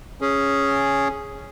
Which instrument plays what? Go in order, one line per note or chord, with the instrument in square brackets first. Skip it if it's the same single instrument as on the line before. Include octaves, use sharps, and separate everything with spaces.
[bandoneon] C#4 G#4